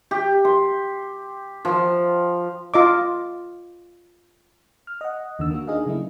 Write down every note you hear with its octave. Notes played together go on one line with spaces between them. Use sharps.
G4
C6
F3
F4 D#5 D6
F6
D#5 F#5
D#2 D3 D#3 A#3 E6
A#3 F#4
D4 D#4 G#4 D#5 F5
C#3 F#3 A3 A#3 E4